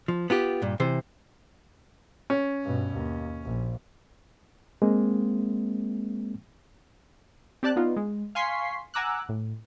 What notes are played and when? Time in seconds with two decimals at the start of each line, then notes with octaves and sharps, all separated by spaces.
0.08 F3
0.30 B3 F4 G4
0.62 G2 A#2
0.80 C3 E3 C5
2.30 C#4
2.63 G2 B2
2.93 D#2
3.44 A#1
4.82 G#3 A#3 C4
7.63 C4 G4 D5 A5 F#6
7.76 B3 D4 D#4 F4
7.97 G#3
8.35 F5 G#5 C6 C#6 B6 C7
8.94 F#5 G#5 A#5 D6 E6 F#6
9.29 A2